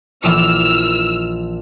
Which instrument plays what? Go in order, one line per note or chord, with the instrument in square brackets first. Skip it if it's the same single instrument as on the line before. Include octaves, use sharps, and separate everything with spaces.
[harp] A#1 E3 D6 [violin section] E6 F6